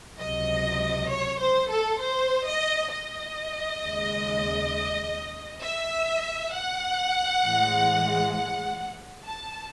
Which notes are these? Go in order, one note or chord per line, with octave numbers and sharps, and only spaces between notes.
C#2 C3 F#3 D#5
C#5
C5
A4
C5
D#5
D#5
D#2 C#3 G#3
E5
F#5
A2 E3 G#3
F#5
A5